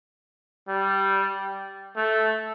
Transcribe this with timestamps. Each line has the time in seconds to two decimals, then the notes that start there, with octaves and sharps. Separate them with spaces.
0.68 G3
1.97 A3